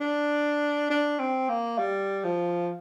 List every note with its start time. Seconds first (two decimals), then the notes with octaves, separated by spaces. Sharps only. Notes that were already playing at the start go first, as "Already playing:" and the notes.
0.01 D4
0.90 D4
1.20 C4
1.49 A#3
1.79 G3
2.24 F3